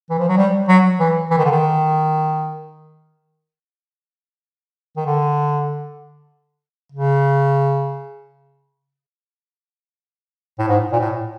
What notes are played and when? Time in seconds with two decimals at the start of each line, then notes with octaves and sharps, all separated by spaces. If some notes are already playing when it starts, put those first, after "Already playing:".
0.10 E3
0.18 F3
0.28 F#3
0.37 G3
0.68 F#3
0.99 E3
1.31 E3
1.38 D#3
1.45 D3
1.52 D#3
4.97 D#3
5.06 D3
6.92 C#3
10.59 A2
10.68 G#2
10.92 A#2
10.99 A2